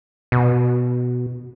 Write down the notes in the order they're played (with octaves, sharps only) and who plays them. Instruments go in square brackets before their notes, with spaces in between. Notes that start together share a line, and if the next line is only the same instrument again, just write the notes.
[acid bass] B2